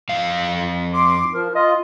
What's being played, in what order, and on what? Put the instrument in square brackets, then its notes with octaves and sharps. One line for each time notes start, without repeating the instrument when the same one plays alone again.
[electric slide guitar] F2 F5
[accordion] C6 D6
[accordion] F3 [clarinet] A#4
[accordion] F4 [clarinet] D#5